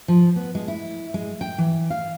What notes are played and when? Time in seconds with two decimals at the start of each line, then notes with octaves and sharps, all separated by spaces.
0.08 F3
0.36 B3
0.55 G#3
0.68 E4
1.14 G#3
1.41 G5
1.58 E3
1.90 F5